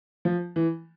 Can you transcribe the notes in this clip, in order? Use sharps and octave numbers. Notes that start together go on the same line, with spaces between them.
F3
E3